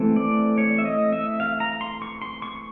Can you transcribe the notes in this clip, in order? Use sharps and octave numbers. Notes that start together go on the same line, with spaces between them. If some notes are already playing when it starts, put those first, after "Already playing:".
Already playing: E3 A3 C4
D5
C#5
E5
D#5
E5
F5
A#5
C6
C#6
C6
C#6